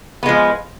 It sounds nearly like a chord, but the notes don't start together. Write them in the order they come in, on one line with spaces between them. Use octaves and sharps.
B3 G#3 F3